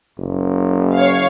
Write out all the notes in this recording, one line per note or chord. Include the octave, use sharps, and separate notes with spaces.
F#1
C#5 F5